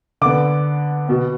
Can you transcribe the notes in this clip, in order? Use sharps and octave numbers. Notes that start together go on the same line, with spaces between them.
D3 B3 D6
B2 B3